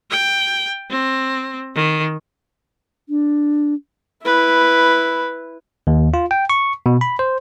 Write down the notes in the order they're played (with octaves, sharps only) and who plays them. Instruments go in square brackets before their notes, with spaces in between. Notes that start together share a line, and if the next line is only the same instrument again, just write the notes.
[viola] G5
C4
D#3
[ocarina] D4
[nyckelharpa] E4 B4
[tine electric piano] D#2
F4
G5
C#6
B2
B5
C5